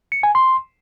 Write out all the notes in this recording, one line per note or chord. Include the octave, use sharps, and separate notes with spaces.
C#7
G#5
C6